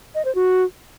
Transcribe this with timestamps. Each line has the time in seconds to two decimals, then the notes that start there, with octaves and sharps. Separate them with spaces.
0.15 D#5
0.25 C5
0.35 F#4